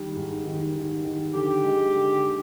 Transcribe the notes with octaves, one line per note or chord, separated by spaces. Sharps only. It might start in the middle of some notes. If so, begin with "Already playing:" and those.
Already playing: D#3 G3
G#2
D#3
D#3
D#3
D3 G4
G#3
D3